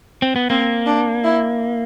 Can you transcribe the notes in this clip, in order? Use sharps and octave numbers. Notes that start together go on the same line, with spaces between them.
C4
B3
A#3 C4
D4
E4